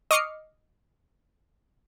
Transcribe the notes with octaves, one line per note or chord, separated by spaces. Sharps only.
D#5 C#6 D6 F6 C7 C#7